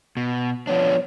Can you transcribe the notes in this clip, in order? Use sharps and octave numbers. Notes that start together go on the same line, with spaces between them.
B2
F3 B3 D4 C#5